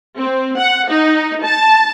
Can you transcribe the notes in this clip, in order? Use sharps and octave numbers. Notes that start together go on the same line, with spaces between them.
C4
F#5
D#4
A5